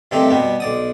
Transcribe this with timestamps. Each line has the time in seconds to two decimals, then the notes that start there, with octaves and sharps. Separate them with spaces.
0.11 G2 C3 D#3 A3 C4 G4
0.30 B2 G3 B3
0.60 B1 D5 D#6